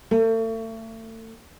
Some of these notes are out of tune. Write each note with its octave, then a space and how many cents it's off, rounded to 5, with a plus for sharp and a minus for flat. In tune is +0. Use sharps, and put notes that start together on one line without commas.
A3 +35